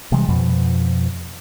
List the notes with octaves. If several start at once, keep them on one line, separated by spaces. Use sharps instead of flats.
C3 E3 G3 G#3
F2 B2 F3